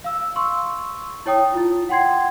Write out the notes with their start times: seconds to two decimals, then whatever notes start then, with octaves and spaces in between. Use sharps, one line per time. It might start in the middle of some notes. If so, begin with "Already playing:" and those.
0.04 F5 E6
0.36 C6 C#6 E6
1.26 E4 C#5 G5 D#6
1.54 E4 F4
1.89 F#5 G5 C6 G#6 C7